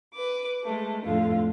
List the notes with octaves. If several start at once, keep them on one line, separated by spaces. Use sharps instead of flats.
B4 D6
G#3 A3
F2 A2 D3 F4